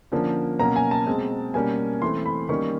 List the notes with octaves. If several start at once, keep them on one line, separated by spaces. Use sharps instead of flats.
D3 F3 A#3 C#4
B2 F#3 A#3 C#4 A#5
G#5
A5
B2 G#3 C4
B2 G3 A#3 C#4 G#5
E3 A3 C4 C6
B5
D#3 G3 A#3 C#4 C#6